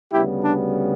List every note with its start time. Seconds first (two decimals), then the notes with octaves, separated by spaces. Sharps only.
0.13 D2 C#3 G3 B3 E4 G4
0.44 D4